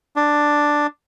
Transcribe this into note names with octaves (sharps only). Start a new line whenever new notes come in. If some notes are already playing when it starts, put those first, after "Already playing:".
D4